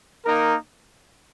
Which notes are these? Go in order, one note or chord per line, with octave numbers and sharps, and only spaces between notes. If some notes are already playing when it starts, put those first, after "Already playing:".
A#3 D#4 A#4